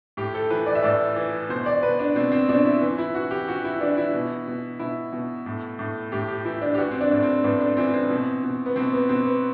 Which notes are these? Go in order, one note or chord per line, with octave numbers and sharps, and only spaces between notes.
A2 G4
A4
E3 B4
D5
E5
A2 D5
E3
B2 C5
D5
B2 B4
D4
B2 C4
C4
B2 D4
E4
E3
E4
E3 F#4
G4
E3 F#4
E4
E3 D4
E4
B2
B2
B2 E4
B2
A2
A2
A2 G4
G4
E3 E4
D4
G4
E3 F#4
C4
D4
A2
C4
A2 B3
D4
E3 C4
C4
B2
B2
B3
B2 C4
B3
B2 C4
B3